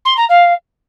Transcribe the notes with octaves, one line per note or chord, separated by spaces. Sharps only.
C6
A#5
F5